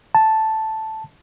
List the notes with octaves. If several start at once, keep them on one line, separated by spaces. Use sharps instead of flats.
A5